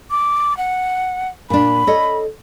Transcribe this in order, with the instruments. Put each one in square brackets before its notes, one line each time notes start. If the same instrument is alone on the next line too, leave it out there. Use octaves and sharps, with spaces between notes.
[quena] D6
F#5
[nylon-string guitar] A#2 D4 [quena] B5
[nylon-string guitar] A4 C#5 D#5